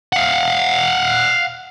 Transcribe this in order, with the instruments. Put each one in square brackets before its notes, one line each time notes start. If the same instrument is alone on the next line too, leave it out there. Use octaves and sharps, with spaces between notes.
[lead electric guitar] F5 F#5